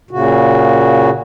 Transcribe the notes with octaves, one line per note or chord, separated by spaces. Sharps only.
A#2 C#3 F#4